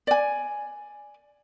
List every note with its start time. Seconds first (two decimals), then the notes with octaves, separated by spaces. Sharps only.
0.07 D5 G#5